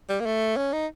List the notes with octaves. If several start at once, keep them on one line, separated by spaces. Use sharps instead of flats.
G3
A#3
A3
C#4
D#4